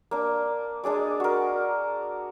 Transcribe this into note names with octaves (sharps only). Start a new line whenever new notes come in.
A#3 D4
G#3 D4 G#4 D5
F#4 A#4